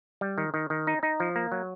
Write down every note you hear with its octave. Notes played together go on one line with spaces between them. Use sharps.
G3
D#3
D#3
D#3
D#4
D#4
F3
A#3
F#3